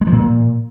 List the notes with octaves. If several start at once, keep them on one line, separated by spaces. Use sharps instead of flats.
G#3
F3
A#2